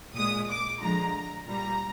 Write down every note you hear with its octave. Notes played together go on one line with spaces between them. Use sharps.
A#2 G#3 D#6
D6
D3 F3 G#3 A#5
A#2 G3 A#5